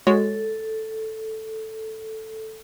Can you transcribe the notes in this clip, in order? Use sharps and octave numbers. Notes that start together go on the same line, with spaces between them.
G#3 F#4 A4 C#5